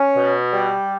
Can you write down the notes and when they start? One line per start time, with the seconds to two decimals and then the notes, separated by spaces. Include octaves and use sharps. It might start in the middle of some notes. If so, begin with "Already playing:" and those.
Already playing: C#4
0.17 B2
0.52 G3